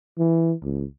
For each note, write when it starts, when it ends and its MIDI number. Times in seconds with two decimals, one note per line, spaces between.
0.18 0.53 52
0.62 0.84 37